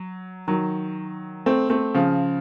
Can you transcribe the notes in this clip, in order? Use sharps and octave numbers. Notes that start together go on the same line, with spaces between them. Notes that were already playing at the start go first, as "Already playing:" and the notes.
Already playing: F#3
D#3 F#3
A3 C4
A3 C4
C#3 F3